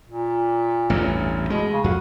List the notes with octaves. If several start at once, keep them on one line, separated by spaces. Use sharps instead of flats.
A#2
A1 E2 G2
B2 G#3
C#3
F2 F#4